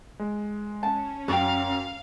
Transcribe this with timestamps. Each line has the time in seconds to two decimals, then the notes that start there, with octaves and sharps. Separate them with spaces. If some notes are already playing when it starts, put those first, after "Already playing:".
0.19 G#3
0.83 C#4 A5
1.28 F#2 F#4 F5 G5